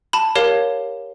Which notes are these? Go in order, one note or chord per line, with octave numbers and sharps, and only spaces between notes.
A5 B5
G4 A#4 C#5 F5